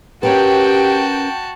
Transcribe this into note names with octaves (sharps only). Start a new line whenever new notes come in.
C#4 F#4 G4 A#4 B4 G5 A5